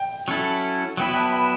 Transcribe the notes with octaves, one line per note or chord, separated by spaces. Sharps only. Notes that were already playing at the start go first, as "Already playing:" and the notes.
Already playing: G5
F#3 C#4 E4 A4
F#3 B3 E4 B4 G5
G5
A5
B5